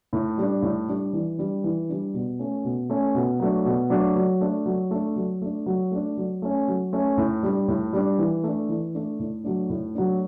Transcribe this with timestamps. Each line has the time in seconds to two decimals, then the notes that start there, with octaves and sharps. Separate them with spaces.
0.13 A2
0.38 G3 D4
0.62 A2
0.88 G3 D4
1.13 E3
1.38 G3 D4
1.64 E3
1.89 G3 D4
2.14 B2
2.39 A3 C#4
2.64 B2
2.90 A3 C#4
3.15 B2
3.40 F#3 A3 D4
3.65 B2
3.90 F#3 A3 D4
4.16 F#3
4.41 A3 D4
4.66 F#3
4.91 A3 D4
5.16 F#3
5.42 A3 D4
5.66 F#3
5.91 A3 D4
6.17 F#3
6.42 A3 C#4
6.68 F#3
6.93 A3 C#4
7.17 A2
7.43 G3 D4
7.68 A2
7.93 G3 D4
8.19 E3
8.44 A3 D4
8.69 E3
8.94 A3 D4
9.19 A2
9.44 F#3 A3 D4
9.69 A2
9.94 F#3 A3 D4